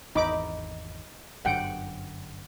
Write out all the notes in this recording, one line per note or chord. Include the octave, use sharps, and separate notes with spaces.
G#1 E2 D#4 B5 D6
G1 F#2 D3 F#5 G5